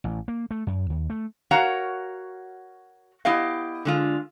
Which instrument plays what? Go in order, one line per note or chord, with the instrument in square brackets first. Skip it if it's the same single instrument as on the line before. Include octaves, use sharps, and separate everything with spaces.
[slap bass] A1
A#3
A3
F#2
D#2
A3
[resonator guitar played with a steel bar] F#4 A#4 C#5 F5 F#5 A#5
B3 E4 G4 D#5 F5
D3 G#3 F4